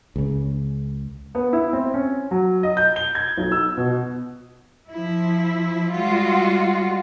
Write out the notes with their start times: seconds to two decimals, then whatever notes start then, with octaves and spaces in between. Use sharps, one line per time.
0.16 C#2 C#3
1.35 B3
1.53 E4
1.73 C4
1.94 C#4
2.31 F#3
2.63 D#5
2.77 G6
2.96 G7
3.15 G#6
3.38 B1
3.52 E6
3.77 B2
4.91 F3 E4
5.91 G3 G#3 F4 F#4